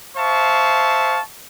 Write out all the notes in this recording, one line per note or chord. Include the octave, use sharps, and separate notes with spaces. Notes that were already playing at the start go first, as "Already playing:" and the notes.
C5 E5 F5 A5 C#6